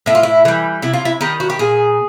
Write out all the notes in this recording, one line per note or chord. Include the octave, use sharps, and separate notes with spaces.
A2 E4
F4
E4
E3 G3
C3 E4
F4
E4
D#3 G3 D#4
F#4
G4
A#2 G#4